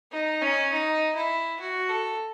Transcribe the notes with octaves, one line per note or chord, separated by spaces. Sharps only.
D#4
C#4
D#4
E4
F#4
A4